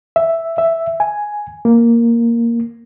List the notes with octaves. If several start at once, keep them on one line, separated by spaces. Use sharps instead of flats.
E5
E5
G#5
A#3